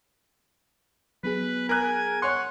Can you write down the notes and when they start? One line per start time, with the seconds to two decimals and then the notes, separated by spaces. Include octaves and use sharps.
1.24 F#3 B3 G#4 B4
1.69 A#4 G#5 F#6
2.22 C#5 F#5 C6